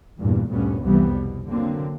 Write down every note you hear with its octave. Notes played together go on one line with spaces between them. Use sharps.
E2 G2 A#2
D2 G2 A#2 B3 C#4
C2 F2 E3 G3 B3
B2
D3 F#3 A#3 C4